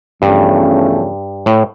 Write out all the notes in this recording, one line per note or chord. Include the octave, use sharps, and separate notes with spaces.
E2 G2 C#3 F3 A3 C#4
A2